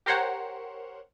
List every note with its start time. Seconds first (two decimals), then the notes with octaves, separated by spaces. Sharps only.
0.06 G4 A#4 C5 C#5 F#5